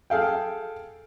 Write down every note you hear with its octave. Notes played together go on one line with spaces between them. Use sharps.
G#4 A4 F5 G5